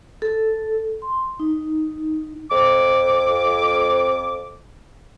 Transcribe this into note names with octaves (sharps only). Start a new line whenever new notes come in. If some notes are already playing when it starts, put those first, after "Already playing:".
A4
C6
D#4
F2 D6